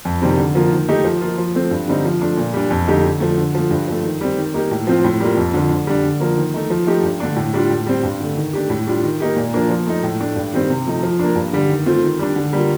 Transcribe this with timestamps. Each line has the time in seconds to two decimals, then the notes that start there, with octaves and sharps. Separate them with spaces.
0.05 F2
0.22 C3 D#3 G3 C4
0.38 D3
0.55 F3 A#3 F4
0.71 D#3
0.89 A3 D#4 G4
1.04 F3
1.22 A#3 F4
1.38 F3
1.55 A3 C4
1.71 G2
1.88 D3 G3 C4 D#4
2.05 F3
2.22 A3 D4
2.37 A#2
2.54 G3 D4
2.70 F2
2.88 D3 A3 D#4 G4
3.04 D3
3.20 F3 A3
3.37 D3
3.55 F3 A3
3.71 G2
3.88 F3 A3
4.04 D#3
4.21 G3 C4
4.38 D#3
4.54 A#3 D#4 G4
4.71 A2
4.87 F3 C4 F4
5.04 A2
5.20 G3 A#3 F4
5.37 F2
5.54 D3 F3
5.71 D3
5.87 G3 D4
6.04 D3
6.20 F3 A#3
6.37 D#3
6.54 A3 D#4
6.70 F3
6.87 A3 D#4 G4
7.03 G2
7.20 D3 A3 D4
7.36 A2
7.54 G3 D4 F4
7.70 A2
7.87 G3 C4
8.03 G2
8.20 D3 A3
8.36 D#3
8.53 A3 D4 G4
8.70 A2
8.87 G3 D4 F4
9.04 D#3
9.20 A#3 D#4 G4
9.36 A#2
9.54 F3 A#3 D4
9.70 F3
9.87 A3 D#4
10.03 A2
10.20 A3 D4
10.36 G2
10.53 D#3 G3 C4
10.70 C3
10.86 F3 A3 D#4
11.03 F3
11.20 A#3 D4
11.36 G2
11.53 D3 G3
11.69 D#3
11.86 A3 C4 F4
12.03 D#3
12.19 G3 D4
12.36 D3
12.53 G3 A#3 F4